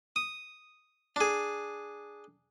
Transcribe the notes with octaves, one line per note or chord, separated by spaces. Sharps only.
D#6
D4 G#4